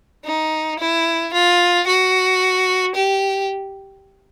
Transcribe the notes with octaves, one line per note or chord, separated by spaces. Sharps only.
D#4
E4
F4
F#4
G4